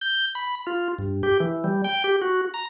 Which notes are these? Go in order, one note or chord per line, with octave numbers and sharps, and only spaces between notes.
G6
B5
F4
G2
G4
E3
G3
G5
G4
F#4
A#5